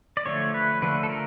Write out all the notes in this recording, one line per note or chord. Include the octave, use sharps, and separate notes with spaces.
D5
D3 F3 A3 C#5
B4
D3 F3 A3 B4
A4
A#4